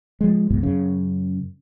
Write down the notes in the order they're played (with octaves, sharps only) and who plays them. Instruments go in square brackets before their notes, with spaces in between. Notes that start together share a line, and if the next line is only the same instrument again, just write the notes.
[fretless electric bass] F3 G#3
G1 C2 G#2 B2
F#2 C#3